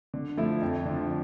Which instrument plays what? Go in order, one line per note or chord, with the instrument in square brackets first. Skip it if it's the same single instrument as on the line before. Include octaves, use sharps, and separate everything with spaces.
[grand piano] D3
F3 A3 E4
F2
D3 F3